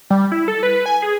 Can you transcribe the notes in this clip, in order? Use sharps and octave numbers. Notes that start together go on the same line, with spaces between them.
G3
E4
A4
B4
G#5
G#4